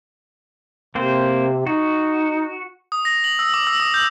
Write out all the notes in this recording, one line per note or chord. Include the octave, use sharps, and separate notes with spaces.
C3 A#3 C4 C5
D#4 F#4
D#6
A#6
F#7
E6
D6
E6
D#6
G6